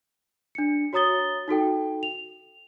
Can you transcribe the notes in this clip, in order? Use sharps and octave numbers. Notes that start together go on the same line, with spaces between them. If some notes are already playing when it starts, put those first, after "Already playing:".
D4 C#7
F#4 C#5 A#5 D#6 A6 G7
D#4 F#4 A4 G5
F7